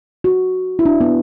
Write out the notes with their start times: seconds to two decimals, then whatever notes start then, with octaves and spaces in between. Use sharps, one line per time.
0.24 F#4
0.79 E4
0.85 D4
1.00 B3